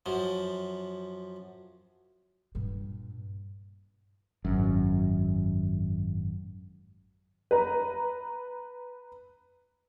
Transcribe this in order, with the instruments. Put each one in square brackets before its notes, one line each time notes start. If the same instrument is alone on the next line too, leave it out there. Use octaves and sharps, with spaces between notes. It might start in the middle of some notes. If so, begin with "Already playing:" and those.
[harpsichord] F#2 F3
[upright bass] G2 A#2
[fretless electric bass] G#1 F#2
[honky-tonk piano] B4 A#5